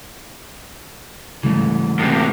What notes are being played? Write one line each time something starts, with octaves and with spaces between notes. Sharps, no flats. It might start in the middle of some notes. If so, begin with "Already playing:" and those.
G#2 C#3 E3 G3 A3
A2 C3